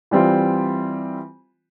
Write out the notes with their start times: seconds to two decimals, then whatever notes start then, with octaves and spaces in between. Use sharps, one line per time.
0.11 E3 G3 C4 F4